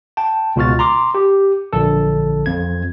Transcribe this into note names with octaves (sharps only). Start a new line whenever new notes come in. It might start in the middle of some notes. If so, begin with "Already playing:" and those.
G5 A5
C#2 B2 F4 F#4 F6 A6
A#5 C6 D6
G4
A#1 D3 A4
F2 G#6